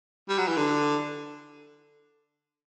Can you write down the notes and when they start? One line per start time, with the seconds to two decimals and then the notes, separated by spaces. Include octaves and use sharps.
0.29 G3
0.38 F#3
0.48 E3
0.57 D3